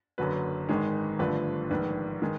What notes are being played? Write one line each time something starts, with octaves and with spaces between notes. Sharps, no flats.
F#1 F#2 D3 F#3 B4
G#1 G#2 D#3 G#3
G#1 G2 D3 F3 A3 B4
A#1 G#2 D#3 B4
D#3 G#3